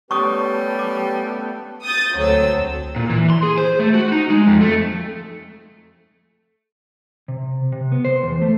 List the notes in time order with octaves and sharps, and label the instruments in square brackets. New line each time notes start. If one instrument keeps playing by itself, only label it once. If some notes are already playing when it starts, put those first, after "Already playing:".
[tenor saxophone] G3 [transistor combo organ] A3 B3 [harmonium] C#4 G4 B4 [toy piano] C#6 D#6
[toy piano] D6
[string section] D#6 G6 A6
D2 F#3 C4 A4 E6
[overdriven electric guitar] A#2
E3
C6
G#4
C5
A3
F#4
D#4
G#3
F2
A3
[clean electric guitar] C3
C3
B3
C5
E2
A3